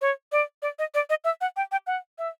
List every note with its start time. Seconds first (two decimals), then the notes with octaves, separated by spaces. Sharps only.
0.01 C#5
0.32 D5
0.62 D5
0.79 D#5
0.94 D5
1.10 D#5
1.24 E5
1.41 F#5
1.57 G5
1.72 G5
1.87 F#5
2.18 E5